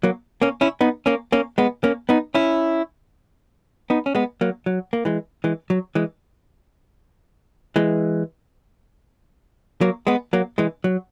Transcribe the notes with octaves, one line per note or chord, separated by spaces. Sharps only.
F#3 A#3
A#3 C#4
C#4 E4
B3 D#4
A#3 C#4
A#3 C#4
G#3 B3
A#3 C#4
B3 D#4
C#4 E4
B3 D#4
C#4
G#3 B3
F#3 A#3
F#3
A#3
E3 G#3
E3 G#3
F#3
E3 G#3
E3 G#3
F#3 A#3
G#3 B3
F#3 A#3
E3 G#3
F#3